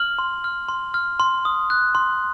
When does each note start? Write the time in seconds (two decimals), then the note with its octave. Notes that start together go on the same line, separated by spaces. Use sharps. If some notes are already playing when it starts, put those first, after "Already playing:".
Already playing: F6 F#7
0.19 C6
0.44 F6
0.68 C6
0.94 F6
1.20 C6
1.45 D#6
1.70 F#6
1.95 C6